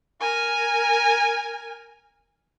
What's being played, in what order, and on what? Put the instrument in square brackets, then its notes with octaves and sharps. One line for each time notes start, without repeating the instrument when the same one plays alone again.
[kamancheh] A#4 G#5